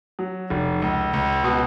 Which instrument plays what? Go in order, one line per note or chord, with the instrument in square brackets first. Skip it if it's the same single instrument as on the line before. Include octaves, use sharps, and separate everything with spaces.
[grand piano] F#3
F1
C#2
C#2
B2